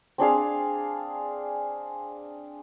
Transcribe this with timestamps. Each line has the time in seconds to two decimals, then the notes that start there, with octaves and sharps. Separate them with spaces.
0.18 C4 D4 G#4 F5